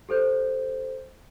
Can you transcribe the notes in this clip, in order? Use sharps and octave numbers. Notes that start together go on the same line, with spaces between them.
G4 A4 C5 G6